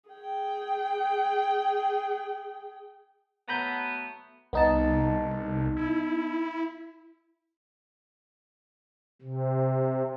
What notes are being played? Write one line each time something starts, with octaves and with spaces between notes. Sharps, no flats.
G#4 G5
F#3 A3 B3 A#5 B5 G6
C2 B3 D#4 A5
E4
C3